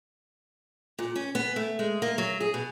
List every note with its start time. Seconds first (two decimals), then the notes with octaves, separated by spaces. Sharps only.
0.99 A#2
1.16 C#4
1.35 B3
1.56 A3
1.79 G#3
2.02 A#3
2.18 F#3
2.40 G#4
2.54 B2